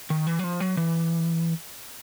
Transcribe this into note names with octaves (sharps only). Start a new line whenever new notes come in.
D#3
E3
F#3
F3
F#3
E3